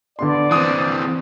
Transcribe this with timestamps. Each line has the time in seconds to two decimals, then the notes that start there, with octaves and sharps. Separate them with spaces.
0.19 D3 B3 D5 C6
0.51 E3 C4 C6 D#6